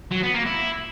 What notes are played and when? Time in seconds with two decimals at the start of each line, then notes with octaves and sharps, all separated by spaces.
0.11 F#3
0.23 B3
0.34 A#3
0.46 E4